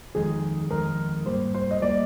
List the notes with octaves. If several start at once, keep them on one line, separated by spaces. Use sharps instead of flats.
F2 D#3 G#3 D#4 G#4
F2 D#3 G#3 D#4 A#4
G#2 G3 A#3 C5
C5
D#5
G3 A#3 D5